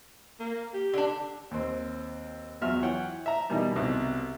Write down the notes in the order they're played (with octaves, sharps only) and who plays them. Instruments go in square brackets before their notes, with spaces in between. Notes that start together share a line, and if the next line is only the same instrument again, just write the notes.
[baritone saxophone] A#3
G4
[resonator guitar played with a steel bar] D3 D4
[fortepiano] D#2 C4
E2 F#3 F4 E5 F6
E3 C#5 F#5 G5
E5 A#5
B2 D#3 E3 G3
C2 B2